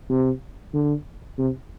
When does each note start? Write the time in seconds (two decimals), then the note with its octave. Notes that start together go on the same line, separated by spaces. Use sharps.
0.10 C3
0.74 D3
1.39 C3